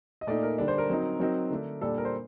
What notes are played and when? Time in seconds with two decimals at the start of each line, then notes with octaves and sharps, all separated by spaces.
0.21 D#5
0.27 A#2 A3 D#4 D5
0.43 A#4
0.58 D3 G3 D4 A#4
0.68 C5
0.78 A#4
0.89 F#3 C4 D#4
1.20 F#3 C4 D#4 A#4
1.50 D3 A3 D4
1.81 A#2 G3 D4 A4
1.98 A#4
2.05 C5